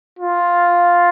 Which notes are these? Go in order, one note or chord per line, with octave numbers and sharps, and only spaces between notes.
F4